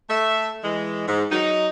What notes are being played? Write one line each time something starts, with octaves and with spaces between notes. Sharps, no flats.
A3 E5
E3 G#3
G#2
F#3 D#4